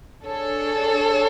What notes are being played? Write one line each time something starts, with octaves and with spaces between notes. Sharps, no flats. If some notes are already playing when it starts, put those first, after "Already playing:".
D4 G#4 A4 C#5